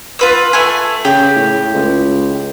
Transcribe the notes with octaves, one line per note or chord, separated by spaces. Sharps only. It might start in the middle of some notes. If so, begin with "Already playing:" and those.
F4 B4 E6
A3 G#5
C#3 G4
A2
C#2